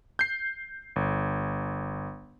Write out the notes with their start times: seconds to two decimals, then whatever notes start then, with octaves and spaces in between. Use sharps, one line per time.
0.19 G6 C7
0.96 G1